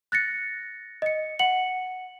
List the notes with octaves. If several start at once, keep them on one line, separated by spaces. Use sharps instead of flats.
F#6 A6 A#6 C#7
D#5 C#7
F#5 C#7 F#7